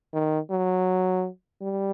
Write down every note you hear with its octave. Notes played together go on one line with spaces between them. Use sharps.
D#3
F#3
G3